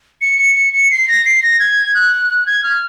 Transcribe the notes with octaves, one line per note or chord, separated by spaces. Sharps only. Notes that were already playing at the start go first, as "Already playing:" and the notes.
C#7
C#7
C#7
C#7
C7
A#6
C7
A#6
G#6
F#6
F#6
G#6
F6